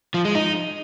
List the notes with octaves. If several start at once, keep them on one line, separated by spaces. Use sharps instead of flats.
F3
G#3
D#4